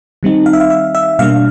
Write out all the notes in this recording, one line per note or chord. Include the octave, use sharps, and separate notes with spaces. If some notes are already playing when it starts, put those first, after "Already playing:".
D#3 G3 C4 D#4
F5
E5
F5
E5
E5
B2 G3 A#3 D4 F5